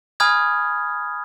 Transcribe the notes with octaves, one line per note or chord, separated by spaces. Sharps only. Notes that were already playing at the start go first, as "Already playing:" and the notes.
G#5 B5 D#6 F6 G#6